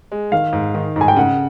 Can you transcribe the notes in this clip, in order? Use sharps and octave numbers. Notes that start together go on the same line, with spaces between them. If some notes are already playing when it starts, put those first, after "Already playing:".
G#3
D#3 F5
G#2
D#3
G#2 G#5
G5
C#3 F#5